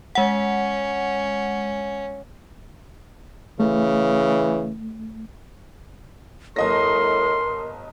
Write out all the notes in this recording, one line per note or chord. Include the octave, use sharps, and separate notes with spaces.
G#3 C#4 F#5
C#3 E3 A3
G1 A2 A#4 D#5 C6 A#6